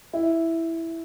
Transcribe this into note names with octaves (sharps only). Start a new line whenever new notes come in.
E4